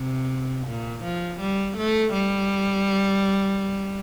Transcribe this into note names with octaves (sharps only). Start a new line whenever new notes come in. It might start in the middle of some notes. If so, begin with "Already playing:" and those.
Already playing: C3
A#2
F3
G3
A3
G3